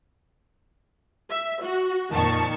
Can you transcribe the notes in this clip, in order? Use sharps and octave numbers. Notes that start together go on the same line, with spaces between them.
E5
F#4
F2 A#2 D#3 A5 C#6